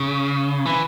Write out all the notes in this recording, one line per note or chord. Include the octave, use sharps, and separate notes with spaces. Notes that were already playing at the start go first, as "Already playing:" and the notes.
Already playing: C#3
E3